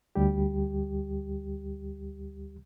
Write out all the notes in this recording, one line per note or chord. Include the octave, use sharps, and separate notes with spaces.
D2 G3 G4